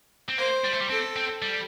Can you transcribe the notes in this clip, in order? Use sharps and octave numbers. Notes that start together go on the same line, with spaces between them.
C4
A#3 C5
G3
A3
G3
C4 A4
C4
G3